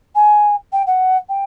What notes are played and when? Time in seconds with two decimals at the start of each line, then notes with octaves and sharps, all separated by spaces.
0.15 G#5
0.72 G5
0.87 F#5
1.29 G5